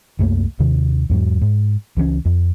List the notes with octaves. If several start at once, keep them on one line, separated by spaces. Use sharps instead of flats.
C2 F#2 A3 A#3
D#2 C3 D#3
E2 G#2 F#3
G#2
C#2 E3 F#3 C#4
F2